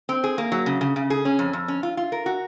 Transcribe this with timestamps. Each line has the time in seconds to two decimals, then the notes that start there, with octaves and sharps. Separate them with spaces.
0.09 C4
0.24 G#4
0.38 A#3
0.52 F#3
0.66 C#3
0.81 C#3
0.96 C#3
1.10 G#4
1.25 C#4
1.39 F2
1.53 F2
1.68 C#4
1.83 F4
1.97 F4
2.12 A#4
2.26 F#4